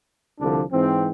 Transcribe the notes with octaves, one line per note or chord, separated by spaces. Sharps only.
C2 D3 F3 D4
G#2 E3 C4